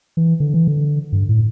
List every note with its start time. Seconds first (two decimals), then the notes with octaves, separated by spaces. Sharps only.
0.17 E3
0.40 D3
0.54 E3
0.68 D3
1.12 G2
1.29 A2